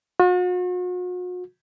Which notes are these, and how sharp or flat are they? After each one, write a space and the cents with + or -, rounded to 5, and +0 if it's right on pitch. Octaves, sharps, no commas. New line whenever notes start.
F#4 -45